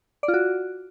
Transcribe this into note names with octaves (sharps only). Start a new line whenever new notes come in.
D5
F4
F#4